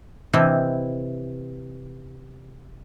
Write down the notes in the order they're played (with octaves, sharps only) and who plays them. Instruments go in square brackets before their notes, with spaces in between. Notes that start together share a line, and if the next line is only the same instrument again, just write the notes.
[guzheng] C3 E3 E4 D#5